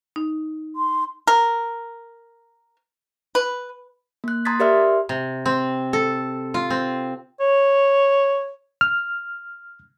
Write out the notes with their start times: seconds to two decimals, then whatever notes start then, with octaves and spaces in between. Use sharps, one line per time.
0.16 D#4
0.76 C6
1.27 A#4
3.35 B4
4.24 A#3 F#6
4.45 A#5 C6 D#6 G#6 A6 B6
4.60 G4 A#4 D5 E5 C6 F6
5.09 C3
5.46 C4
5.93 A4
6.54 F4
6.70 C4
7.40 C#5
8.81 F6